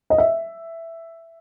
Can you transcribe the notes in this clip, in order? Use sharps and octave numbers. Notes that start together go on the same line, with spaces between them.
D#5
E5